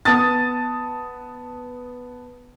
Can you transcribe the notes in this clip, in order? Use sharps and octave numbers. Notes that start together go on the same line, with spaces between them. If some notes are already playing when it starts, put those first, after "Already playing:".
B3 A5 D#6 A6